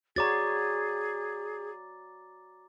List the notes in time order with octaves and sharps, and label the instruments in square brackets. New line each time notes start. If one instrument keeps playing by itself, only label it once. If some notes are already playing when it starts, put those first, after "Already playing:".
[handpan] F#4 C#5 D5 [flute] G#4 [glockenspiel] A#5 D6 A6